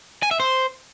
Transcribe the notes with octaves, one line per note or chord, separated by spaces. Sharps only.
G#5
E5
C5